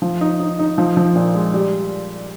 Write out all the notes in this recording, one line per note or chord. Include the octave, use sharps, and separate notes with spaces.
F3
D#4
D#4
D#4
F3
F3
A#2
G#3
G3